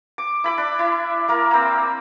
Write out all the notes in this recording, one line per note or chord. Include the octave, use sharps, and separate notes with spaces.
D6
E4 B5 D6
D4
E4
A#3 E4 A#4
A#3 C4